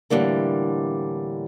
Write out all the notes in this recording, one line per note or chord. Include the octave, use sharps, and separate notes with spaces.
A2 D3 E3 G3 A#3